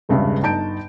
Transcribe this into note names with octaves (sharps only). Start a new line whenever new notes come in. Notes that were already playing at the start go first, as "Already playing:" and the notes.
E1 C#2 G2 C#3 E5
G1 D#4 A5 G6 D7